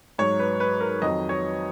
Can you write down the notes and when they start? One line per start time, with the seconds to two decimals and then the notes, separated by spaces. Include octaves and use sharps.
0.19 G#2 F#3 C#5
0.39 B4
0.60 B4
0.81 A#4
1.02 F2 D#3 F#3 D#5
1.29 C#5